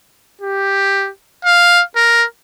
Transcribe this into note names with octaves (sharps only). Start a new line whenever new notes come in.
G4
F5
A#4